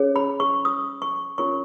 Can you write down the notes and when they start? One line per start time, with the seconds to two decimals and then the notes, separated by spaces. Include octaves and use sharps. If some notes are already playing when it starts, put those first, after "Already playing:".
Already playing: C#4 G#4 C#5
0.16 B5
0.40 C#6
0.65 D#6
1.02 C#6
1.38 C#4 F4 A#4 C#5 C#6